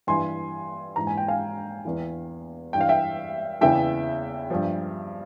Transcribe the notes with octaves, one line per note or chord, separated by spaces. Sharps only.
G2 E3 G#5 C6
G#2 E3 A#5
G#5
G5
F5 G#5
E2 E3
G2 E3 G5
F5
E5 G5
E2 C#3 E3 E5 G5
G2 F3